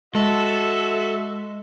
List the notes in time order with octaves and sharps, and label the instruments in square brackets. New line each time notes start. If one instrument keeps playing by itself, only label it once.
[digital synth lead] G#3 [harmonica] F#4 E5 [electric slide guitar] A4